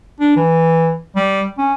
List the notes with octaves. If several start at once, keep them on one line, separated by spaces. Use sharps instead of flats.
D4
E3
G3
C#4